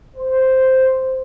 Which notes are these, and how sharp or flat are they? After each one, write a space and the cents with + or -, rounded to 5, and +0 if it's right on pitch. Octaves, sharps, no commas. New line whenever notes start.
C5 -5